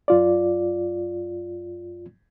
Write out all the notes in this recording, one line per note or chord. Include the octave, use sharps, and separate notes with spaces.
F#2 F4 D5